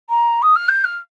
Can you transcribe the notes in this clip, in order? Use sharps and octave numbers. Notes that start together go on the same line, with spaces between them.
A#5
D#6
F6
G6
F6